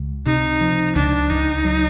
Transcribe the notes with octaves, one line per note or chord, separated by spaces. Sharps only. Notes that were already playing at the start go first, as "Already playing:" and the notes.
Already playing: C#2
C3 D#4
F3
C#2 D4
C#2 D#4
F#3